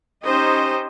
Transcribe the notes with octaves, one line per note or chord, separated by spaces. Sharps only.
C#4 D#4 G4 C5 D#5